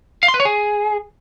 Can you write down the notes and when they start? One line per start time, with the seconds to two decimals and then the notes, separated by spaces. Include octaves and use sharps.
0.23 F5
0.28 C6
0.34 B4
0.40 C#5
0.45 G#4